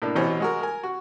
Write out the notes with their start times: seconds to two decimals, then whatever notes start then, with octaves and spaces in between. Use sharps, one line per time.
0.02 A2 A#3 D4
0.16 A1 B2 E3 C5 C#5
0.40 G#3 F#4 A#4
0.61 A#4 G#5
0.83 F#4